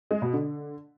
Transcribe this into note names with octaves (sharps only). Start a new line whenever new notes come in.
G#3
B2
D3